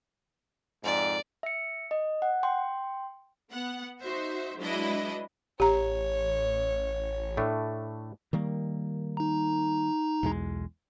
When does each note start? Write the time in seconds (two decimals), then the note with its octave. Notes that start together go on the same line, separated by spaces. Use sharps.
0.84 F2 G#2 D5
1.43 E5 C#7
1.91 D#5
2.22 F#5
2.43 G5 C6
3.51 B3 F#5
4.00 D#4 F#4 C5 E5
4.58 F#3 G#3 D4 E4 B4 D#5
5.60 A1 G4 C#5 A#5
7.37 A2 A3 D4
8.33 D#3 G3 A#3
9.17 D#4 A#5
10.23 B1 E2 G#3